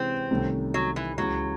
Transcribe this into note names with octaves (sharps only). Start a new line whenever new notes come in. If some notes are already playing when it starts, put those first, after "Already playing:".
Already playing: C3 E3 G#3 C4 C#4 E4
C2 C3 D#3 A3 C#4
F#3
E3
C#2 C#3 E3 F#3